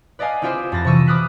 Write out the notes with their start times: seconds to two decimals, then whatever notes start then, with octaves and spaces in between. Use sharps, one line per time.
0.19 B4 D5 D#5 F5 G#5
0.42 C4 E4 F4 G4 G#4 C5
0.72 F2 F4 B5 A6 A#6
0.84 C3 E3 C#6 E6 D#7
1.07 B5 D6 D#6 F6 F#6 B6